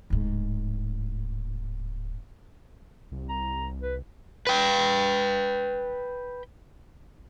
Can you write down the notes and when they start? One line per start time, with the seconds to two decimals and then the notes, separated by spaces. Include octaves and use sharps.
0.10 D1 G#2
3.12 C2
3.29 A#5
3.82 B4
4.47 B4 G5